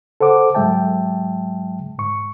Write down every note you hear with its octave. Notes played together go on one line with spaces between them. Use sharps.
A4 C5 F#5 D6
G#2 F#3 G#3 E5 G5 A5
G#2 C#6